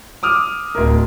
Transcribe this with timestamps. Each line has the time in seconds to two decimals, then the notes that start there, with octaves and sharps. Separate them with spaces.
0.23 D6 D#6 F6
0.75 D1 A#4